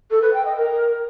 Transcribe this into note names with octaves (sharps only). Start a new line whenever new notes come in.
A4
B4
G5
D#5
A#4